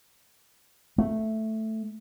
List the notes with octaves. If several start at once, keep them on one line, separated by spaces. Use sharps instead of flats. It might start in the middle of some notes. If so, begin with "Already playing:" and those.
A3